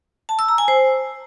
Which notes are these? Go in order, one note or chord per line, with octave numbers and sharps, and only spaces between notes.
A5
E6
A#5
G#5
C5